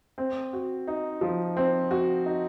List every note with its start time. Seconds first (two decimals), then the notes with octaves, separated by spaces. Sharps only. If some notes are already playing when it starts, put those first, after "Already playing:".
0.18 C4
0.53 F#4
0.87 D#4
1.21 F3
1.57 C4
1.91 F#4
2.26 D#4